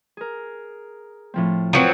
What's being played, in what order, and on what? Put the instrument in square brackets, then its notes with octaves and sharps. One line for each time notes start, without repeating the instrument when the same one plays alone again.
[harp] G#4 A#4
A2 F3 C4
[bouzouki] F3 F#3 C4 [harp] A#4 B4 C#5